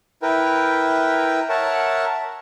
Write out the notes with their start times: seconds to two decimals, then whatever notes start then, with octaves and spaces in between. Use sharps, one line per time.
0.22 E4 A#4 B4 G5
1.49 A#4 C#5 E5 F#5 A5